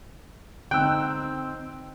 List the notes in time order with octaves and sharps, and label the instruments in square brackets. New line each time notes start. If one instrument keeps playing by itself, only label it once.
[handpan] D3 D#4 [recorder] C4 [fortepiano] G5 [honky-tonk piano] E6 F#6